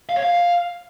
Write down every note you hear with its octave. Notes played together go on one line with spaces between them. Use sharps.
F5
C#5
F5